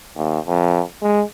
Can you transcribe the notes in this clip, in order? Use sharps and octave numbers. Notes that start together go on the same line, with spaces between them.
D#2
F2
G#3